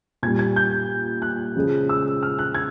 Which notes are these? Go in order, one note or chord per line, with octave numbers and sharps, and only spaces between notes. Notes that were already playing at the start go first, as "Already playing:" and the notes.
A#2 G3 G#6
G#6
G6
F#6
C#3 F3 G#3
E6
F6
F#6
G#6